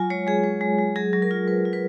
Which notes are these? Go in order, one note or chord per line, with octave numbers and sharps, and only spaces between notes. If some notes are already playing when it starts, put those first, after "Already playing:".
Already playing: F#3 F4 G#5
G#3 C#5
G#3 G#4
G#3
G#3
G#3
F#3 G#4
F#3
A#4
F4
F#3 B4
F4
B4